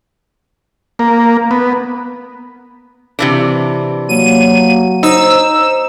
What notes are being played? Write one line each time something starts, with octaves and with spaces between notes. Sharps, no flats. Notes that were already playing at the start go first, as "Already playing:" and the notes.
A#3
B3
C3 E3 D4
F#3 A#3 D#7
D#4 C5 E6